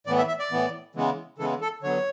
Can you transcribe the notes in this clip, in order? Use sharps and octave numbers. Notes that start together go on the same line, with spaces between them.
A2 E3 B3 D5
E5
E5
D5
A2 E3 B3
C#3 E3 G#3 B3
C#3 E3 G#3 B3 A4
A4
D3 F#3 B3 C#5